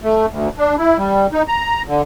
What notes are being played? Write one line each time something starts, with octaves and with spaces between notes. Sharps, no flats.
A3
D2
D4
E4
G3
D#4
A#5
D3